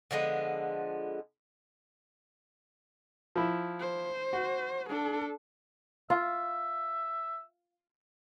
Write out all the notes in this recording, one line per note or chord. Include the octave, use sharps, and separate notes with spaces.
D3 F3 G#3 B3
F3 E4
C5
F#4
D4 A4
F4 E5